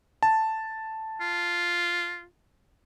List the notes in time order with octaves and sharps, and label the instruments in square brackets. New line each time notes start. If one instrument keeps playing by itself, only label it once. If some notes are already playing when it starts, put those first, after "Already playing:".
[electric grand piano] A5
[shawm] F4